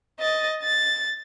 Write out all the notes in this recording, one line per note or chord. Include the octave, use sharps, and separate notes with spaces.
D#5 A6
A6